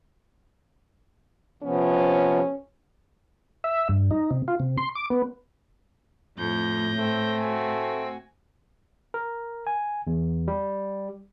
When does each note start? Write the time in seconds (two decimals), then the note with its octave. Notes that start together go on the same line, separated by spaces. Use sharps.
1.63 C3 F3 B3 C#4
3.64 E5
3.89 G2
4.11 D#4
4.30 C3
4.48 F4
4.60 C3
4.78 C6
4.95 D6
5.10 B3
6.39 F2 A2 G6 A#6
6.99 A3 C4
7.40 F#4 G#5
9.14 A#4
9.67 G#5
10.07 E2
10.48 G3